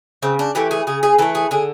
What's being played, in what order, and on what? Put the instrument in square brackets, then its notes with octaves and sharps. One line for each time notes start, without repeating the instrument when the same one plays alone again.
[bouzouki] C#3 C4
D4
E3 A3 G4
G#4
C#3 G#4
G#4
E3 A3 A4
G#4
D3 G#4